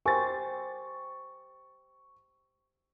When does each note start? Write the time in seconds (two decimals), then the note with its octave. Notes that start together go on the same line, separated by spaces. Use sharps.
0.06 G4 A#4 C5 G#5 C#6 A6